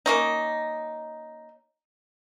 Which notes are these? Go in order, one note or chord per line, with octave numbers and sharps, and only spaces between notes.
A#3 C#4 D#4